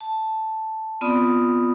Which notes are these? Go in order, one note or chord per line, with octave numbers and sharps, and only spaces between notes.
A5
B3 C4 F4 D5 B5 D#6